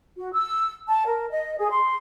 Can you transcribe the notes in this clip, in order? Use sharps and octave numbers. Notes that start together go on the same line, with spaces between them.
F#4
E6
A5
A#4
D#5
G#4
C6